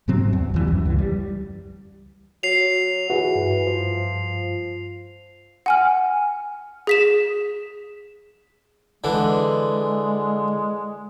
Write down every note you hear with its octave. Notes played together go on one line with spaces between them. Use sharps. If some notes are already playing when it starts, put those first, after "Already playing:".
G#2 C3 F#3 C4
E2
D#2 E3 G3
F#2
C#2 E3
G3
F#3 C7 F7
E3 F#4 G#4
G2
F3
F#5 G#5 F6
G#4 B6 E7
D3 E3 G#3